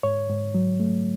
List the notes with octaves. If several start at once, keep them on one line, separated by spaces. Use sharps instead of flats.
G#2 C#5
G#2
F#3
A3